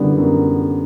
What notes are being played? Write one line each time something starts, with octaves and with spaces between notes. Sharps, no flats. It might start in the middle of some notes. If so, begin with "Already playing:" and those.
Already playing: F#2 D3 G3 B3 D4
F#2